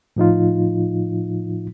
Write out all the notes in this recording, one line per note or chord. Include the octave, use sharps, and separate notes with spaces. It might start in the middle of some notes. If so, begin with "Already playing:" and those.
A2 F3 D#4 F4